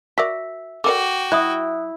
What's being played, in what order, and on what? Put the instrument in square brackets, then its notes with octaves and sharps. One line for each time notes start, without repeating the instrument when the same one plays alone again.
[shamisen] F#4 A#4 D5 [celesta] E5 E6 B6
[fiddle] F#4 G5 [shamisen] A4 A#4 D5 [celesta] D6
[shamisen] F#3 [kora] E4 [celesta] E5 D#6 F#6